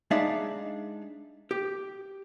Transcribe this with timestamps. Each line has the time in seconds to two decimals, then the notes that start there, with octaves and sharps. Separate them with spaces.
0.11 G#3 D4 D#4 D5 E5 F5
1.51 G4